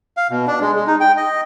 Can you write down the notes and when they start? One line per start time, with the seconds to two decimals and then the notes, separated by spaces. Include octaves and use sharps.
0.17 F5
0.30 B2
0.47 D4
0.61 G#3
0.75 G#3
0.87 D#4
1.00 G5
1.17 D#5